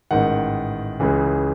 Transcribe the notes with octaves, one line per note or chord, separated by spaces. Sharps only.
A1 G#2 D#3 F#5
C#2 C#3 E3